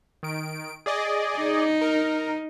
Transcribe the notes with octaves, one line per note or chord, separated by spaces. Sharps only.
D#3 D7
G#4 D5 D#5
D#4
A#4